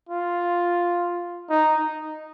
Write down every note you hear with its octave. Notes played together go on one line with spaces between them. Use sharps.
F4
D#4